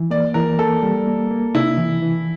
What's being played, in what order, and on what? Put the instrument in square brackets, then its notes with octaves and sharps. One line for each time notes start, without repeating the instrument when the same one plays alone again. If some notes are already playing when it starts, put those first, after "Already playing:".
Already playing: [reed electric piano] E3
[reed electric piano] A#3 [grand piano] D5
[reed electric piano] E3 [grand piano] A#4
[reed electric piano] A#3 [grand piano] A4
[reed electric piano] G3
A#3
A#3
[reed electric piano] C3 [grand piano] E4
[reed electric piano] E3
E3